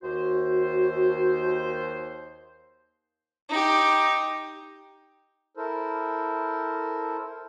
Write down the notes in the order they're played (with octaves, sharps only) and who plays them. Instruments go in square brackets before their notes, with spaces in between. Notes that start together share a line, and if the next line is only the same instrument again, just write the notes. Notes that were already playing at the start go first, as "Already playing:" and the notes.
[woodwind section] D#2 C5 [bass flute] F#4
[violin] D#4 G4
[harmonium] E4 A4 A#4 C5